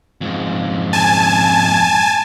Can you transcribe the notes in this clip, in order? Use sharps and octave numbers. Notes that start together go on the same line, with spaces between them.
F2 G#2
G#5 A5